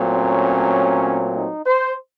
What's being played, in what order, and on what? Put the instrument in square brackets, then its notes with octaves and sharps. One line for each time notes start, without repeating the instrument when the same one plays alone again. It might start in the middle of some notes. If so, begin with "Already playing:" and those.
Already playing: [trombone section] A#2 F#3 A3 C4
C#4
D#4
C5